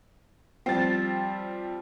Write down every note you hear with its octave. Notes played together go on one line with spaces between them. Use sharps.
F3 G3 C4 F4 A6